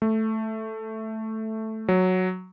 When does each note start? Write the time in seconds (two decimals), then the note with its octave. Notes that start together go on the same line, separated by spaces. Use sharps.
0.02 A3
1.88 F#3